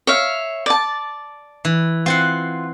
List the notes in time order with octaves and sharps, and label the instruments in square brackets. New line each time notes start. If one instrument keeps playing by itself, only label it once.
[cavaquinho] C#5 E5 F5
D5 A5
[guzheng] E3
[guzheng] C4 C5 F#5 [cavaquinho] F4